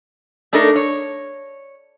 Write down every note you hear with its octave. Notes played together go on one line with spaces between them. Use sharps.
A3 D4 D#4 A4 A#4
C#5